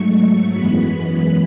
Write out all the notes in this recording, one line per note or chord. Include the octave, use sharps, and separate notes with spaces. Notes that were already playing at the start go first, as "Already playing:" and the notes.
Already playing: G#2 F#3 A3 C#6
F#2 E3 G#3 B3 B5